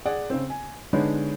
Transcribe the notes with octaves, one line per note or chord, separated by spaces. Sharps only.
G#4 D5 F#5
C#3 C4
G#5
D3 G#3 B3 D4 D#4 C#5